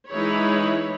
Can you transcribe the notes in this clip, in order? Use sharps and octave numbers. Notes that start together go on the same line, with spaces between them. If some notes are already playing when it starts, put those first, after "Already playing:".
E3 G#3 D#4 E4 C#5 B5